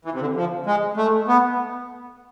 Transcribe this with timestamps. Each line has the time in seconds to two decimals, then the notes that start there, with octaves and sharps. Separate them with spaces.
0.05 E3
0.13 C3
0.21 D3
0.36 F3
0.66 G#3
0.97 A3
1.28 B3